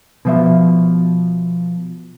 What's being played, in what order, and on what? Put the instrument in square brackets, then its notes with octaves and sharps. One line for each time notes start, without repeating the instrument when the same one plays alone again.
[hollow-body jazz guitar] B2 F3 E5